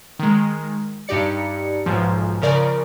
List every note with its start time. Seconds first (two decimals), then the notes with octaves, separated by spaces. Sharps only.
0.19 D#3 G#3
1.08 G2 D#4 G4 D5 C#7
1.86 B1 G#2 F3
2.42 C#3 F3 A#4 D5